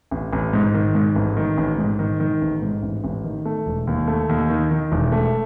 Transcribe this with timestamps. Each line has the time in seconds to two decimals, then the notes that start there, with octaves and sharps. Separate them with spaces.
0.11 A1
0.33 A1
0.53 G#2
0.74 D#3
0.95 G#2
1.16 A1
1.37 D#3
1.57 A1
1.78 G#2
1.99 D#3
2.20 D#3
2.41 A1
2.62 G#2
2.82 A1
3.04 A1
3.24 D#3
3.45 A3
3.66 E1
3.87 D#2
4.08 A3
4.29 D#2
4.49 D#3
4.71 D#3
4.92 E1
5.12 A3